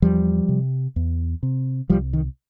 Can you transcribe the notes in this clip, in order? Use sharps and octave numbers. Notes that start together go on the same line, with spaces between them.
E2 F3 G3
C3
E2
C3
C2 F3 G3
D#3